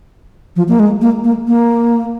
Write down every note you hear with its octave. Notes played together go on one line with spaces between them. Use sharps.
F3
A#3
G#3
A#3
A#3
A#3